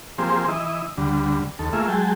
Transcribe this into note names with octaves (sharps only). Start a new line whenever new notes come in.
F3 A#3 C4 G4 G#4 C5
E3 E4 D#5
D2 D3 G3
D#2 A4
A3 A#3 F4 G#4 E5
F#3 G#3 G#4 G5 A5